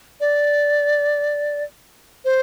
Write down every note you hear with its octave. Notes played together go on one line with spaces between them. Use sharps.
D5
C5